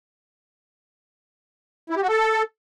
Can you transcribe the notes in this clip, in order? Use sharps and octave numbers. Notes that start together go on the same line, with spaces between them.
E4
G4
F#4
A4